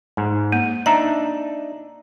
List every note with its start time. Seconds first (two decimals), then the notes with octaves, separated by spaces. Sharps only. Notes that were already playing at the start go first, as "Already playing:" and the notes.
0.17 G#2
0.52 A#3
0.86 D4 D#4 E5 A#5